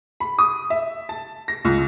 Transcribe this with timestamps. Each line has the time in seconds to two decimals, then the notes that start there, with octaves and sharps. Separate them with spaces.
0.20 B5
0.39 D#6
0.70 E5
1.09 A5
1.48 A#6
1.65 C#2